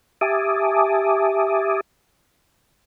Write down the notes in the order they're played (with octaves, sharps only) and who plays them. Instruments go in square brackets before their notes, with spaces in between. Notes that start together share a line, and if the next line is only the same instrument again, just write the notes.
[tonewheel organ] G4 E5 G#5 A5 D6 D#6